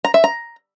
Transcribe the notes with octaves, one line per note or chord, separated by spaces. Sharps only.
A#5
E5
A#5